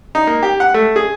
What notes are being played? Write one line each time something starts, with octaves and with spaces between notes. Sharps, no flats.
D#4
A#3
G4
F#5
A3
G#4